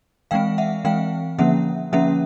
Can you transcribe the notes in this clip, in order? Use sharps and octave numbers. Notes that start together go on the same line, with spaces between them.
E3 G#3 C4 F5 G5
E5 F#5
E3 G#3 C4 F5 G5
D3 F3 A#3 C#4 E5 F#5
D3 F3 A#3 C#4 E5 F#5